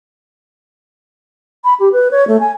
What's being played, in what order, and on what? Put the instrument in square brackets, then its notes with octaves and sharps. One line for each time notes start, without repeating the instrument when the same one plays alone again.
[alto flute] B5
G4
B4
C#5
A3
G#5